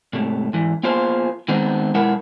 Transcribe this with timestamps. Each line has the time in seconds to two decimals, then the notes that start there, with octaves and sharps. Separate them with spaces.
0.13 G#2 C3 A3
0.53 G#2 E3
0.83 A#3 B3 F4 G#4 C5
1.48 D#3 G#3 B3 C4 D#4
1.94 B1 G#3 E4 A#4 B4 F#5